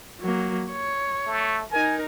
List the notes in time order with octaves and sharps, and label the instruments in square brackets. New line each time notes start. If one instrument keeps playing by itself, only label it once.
[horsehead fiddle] F#3 A#3
C#5
[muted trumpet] A3
[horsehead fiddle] D#4 A#4 [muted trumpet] G#5